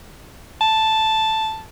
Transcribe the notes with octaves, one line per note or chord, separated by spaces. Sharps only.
A5